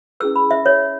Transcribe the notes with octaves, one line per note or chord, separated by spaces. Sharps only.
C#4 E4 G#4 B4 E6
B5
E5
C#5